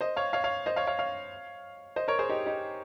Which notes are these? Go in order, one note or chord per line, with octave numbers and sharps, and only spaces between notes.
C5 D#5
C#5 F5
C#5 F5
C#5 F5
C5 D#5
C#5 F5
C#5 F5
C#5 F5
C5 D#5
A#4 C#5
G#4 C5
D#4 G4
D#4 G4